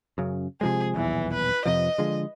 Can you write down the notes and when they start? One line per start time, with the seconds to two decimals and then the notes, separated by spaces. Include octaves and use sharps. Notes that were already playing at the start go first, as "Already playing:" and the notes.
0.18 F#2 C#3
0.61 C3 F3 G#3 G#4
0.96 D#1 B1 E2 E3
1.34 B4
1.65 F2 C3 F3 D#5
1.98 D3 F3 G#3